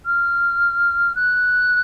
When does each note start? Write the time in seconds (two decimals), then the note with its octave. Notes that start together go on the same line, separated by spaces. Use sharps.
0.06 F6
1.16 F#6